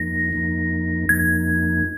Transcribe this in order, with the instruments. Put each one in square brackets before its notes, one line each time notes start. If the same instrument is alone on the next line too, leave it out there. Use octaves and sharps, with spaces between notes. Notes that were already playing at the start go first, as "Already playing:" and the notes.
Already playing: [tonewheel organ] F2 F3 A#3 D#4 [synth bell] A#6
[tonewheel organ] F2 F3 A#3 D#4
[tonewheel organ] F2 F3 A#3 D#4 [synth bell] G#6